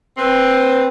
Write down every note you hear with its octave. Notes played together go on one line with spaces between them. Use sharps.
C4 B4